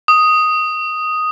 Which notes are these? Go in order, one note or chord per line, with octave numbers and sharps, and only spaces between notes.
D#6